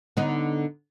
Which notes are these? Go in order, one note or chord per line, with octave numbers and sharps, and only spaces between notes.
D3 B3 D#4